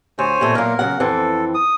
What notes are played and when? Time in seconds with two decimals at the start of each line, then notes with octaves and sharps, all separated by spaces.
0.19 D2 C5 C#5 G#5
0.41 E2 A#2 A3
0.55 A#2 F#3 A#3 A#4
0.79 C#3 F#3 F#5
1.00 F2 E3 C4 A4
1.54 D#6